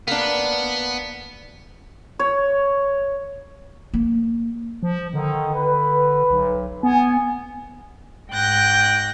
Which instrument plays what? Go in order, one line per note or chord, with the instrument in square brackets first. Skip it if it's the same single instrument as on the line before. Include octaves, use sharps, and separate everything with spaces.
[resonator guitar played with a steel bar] A#3 D4 [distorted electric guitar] B3
[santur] C#5
[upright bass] A#3
[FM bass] F3
[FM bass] D3 [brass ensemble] D#3
[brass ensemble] B4
[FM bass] B1
[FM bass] B3 [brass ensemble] G#5
[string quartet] G#2 G5 F#6 G6 A#6